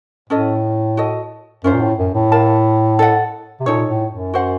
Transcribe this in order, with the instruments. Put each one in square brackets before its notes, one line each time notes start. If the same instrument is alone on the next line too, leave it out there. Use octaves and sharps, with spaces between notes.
[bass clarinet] A2 [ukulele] C#4 A4 D#5
[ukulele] F#4 A4 D#5
[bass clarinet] F#2 [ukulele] C#4 F4 C5
[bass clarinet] A#2
A2
F#2
A2
[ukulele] A#4 F5 A5
A4 D#5 F#5
[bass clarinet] C3
[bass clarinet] A#2 [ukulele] D#4 A4 C#5
[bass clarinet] A2
F#2
[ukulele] F#4 C5 F#5